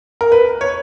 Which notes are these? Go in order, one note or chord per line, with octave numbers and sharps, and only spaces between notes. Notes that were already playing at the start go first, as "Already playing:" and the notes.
A#4
B4
C#5